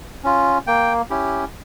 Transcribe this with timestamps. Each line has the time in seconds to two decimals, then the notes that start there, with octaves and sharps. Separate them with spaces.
0.24 C#4 F4
0.67 A#3 G5
1.10 C#4 E4 G4